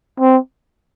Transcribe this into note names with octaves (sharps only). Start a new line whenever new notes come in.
C4